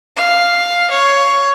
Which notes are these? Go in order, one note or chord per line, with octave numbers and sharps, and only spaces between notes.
F5
C#5